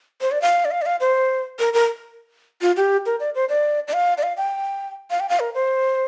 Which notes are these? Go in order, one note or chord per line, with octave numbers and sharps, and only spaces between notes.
C5
D5
F5
D5
F5
D5
F5
C5
A#4
A#4
F4
G4
A#4
D5
C5
D5
D5
F5
D5
F5
G5
F5
G5
F5
A#4
C5